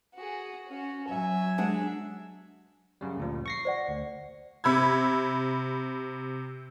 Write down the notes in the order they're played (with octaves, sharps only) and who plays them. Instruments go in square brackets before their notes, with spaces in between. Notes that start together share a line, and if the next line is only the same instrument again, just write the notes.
[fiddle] F#4 G#4
C#4 F#4
[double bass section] F#3 [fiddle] E5 [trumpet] G#5
[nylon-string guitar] G#3 D4 F#5
[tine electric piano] F#2 C#3 G3
D2 A#2 F3
C#6 A#6 C7
[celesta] C5 D5 F#5
[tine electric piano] D2
[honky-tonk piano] C3 B5 E6 G#6